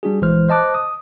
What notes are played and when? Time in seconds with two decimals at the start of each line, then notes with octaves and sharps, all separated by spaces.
0.03 G3 D4 F#4 G#4
0.22 A#1 E3 G#3 C5 F6
0.49 C5 D#5 A5 D6 F#6
0.74 D#6